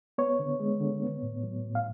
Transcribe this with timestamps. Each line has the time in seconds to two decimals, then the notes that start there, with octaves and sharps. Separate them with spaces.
0.18 B3 C#5
0.39 D3
0.60 G#3
0.80 D3
1.02 B3
1.22 A2
1.43 F#3
1.65 A2
1.75 F5